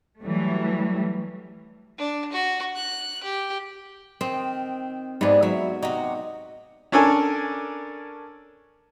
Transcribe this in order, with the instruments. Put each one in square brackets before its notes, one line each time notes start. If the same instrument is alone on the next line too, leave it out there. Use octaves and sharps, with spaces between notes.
[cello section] E3 F#3 G3 A3
[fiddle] D4
F#4
F#6
G4
[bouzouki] D#3 [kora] C4
[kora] G#2 B3 G#4 [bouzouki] G3 D4
[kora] F#3 [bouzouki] E5
[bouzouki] C3 F#4 [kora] D#4
[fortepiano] C#4 D4 A4 A#4 G#5